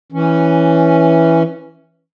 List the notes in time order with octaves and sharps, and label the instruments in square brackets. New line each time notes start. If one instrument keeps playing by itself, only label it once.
[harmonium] E3 C#4